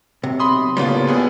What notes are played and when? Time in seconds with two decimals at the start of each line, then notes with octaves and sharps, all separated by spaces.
0.23 B1 C3
0.40 B5 C6 D#6
0.77 A2 C#3 G3 A#3 B3 F4
1.07 C#2 B3 G#4